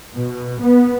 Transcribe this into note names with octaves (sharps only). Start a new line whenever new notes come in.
B2
B3